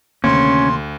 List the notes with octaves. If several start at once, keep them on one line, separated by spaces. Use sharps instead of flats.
D2 C3 D#3 A#3 C#4 C6